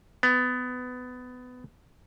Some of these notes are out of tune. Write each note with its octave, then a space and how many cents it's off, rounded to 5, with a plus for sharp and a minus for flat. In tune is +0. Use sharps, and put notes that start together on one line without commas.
B3 +20